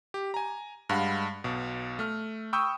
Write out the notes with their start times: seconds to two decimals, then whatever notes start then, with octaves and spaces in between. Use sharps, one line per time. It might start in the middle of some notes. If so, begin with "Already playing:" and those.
0.14 G4
0.34 G#5 A#5
0.89 G2 G#3 F5 F#5 B5
1.44 B1 B2
1.99 A3 F6
2.53 G5 B5 C#6 D#6 E6 G6